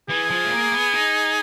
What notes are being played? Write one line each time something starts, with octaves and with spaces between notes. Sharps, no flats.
E3 G#4
F3
A3
A#3
B3
D#4